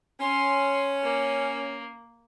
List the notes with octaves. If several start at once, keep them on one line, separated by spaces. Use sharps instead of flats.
C#4 C6
A#3